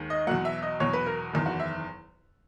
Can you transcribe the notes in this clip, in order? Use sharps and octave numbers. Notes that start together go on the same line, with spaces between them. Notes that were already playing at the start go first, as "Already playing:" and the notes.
Already playing: D#2 D#3 G#3
D#5
E2 B2 F#3 F#5
E5
D#5
E2 B2 F#3 C#5
B4
A#4
F#1 E2 D#3
F#4
E5